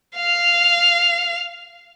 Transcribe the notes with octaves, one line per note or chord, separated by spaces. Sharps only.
F5 F7